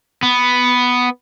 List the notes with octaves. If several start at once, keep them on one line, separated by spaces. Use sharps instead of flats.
B3